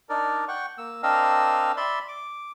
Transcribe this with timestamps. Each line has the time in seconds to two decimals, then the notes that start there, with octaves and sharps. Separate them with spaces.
0.09 D4 D#4 A#4 D5
0.48 F#5 G5 C#6
0.78 A#3 E6
1.03 C4 D4 A#4 D#5 F5 E6
1.77 D5 E5 B5 C6
2.08 D6